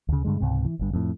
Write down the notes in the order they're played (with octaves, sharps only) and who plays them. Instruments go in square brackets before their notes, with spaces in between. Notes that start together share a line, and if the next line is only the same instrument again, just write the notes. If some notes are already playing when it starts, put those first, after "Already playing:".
[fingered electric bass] D2 C#3
G2 D3 G#3
C#2 G#2 C3
E3
G1 G2
F2 A2